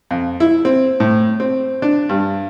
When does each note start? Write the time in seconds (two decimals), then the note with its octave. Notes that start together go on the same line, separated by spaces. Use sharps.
0.11 F2
0.40 E4
0.65 C4
1.00 A2
1.40 C4
1.82 D4
2.09 G2